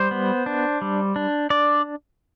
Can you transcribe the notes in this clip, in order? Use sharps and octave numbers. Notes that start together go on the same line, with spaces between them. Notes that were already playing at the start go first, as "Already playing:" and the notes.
Already playing: G3 C5
B3
D4
G3
D4
D4 D5